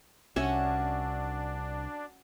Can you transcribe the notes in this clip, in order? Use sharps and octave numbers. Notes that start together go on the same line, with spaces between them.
C2 C#4 D4 F#4 E5